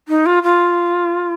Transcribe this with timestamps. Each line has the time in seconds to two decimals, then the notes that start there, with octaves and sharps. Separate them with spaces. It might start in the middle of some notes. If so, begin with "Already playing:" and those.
0.08 D#4
0.26 F4
0.43 F4